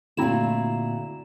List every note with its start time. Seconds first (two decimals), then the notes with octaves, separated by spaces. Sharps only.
0.17 A#2 D3 A3 C4 E4 F#4 A#5 E7